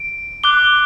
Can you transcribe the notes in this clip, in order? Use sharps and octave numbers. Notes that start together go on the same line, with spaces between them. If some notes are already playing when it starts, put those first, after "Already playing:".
Already playing: D7
D6 F#6 G7